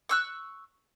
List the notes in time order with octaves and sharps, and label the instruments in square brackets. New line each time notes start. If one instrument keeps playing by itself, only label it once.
[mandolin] C#6 E6 F#6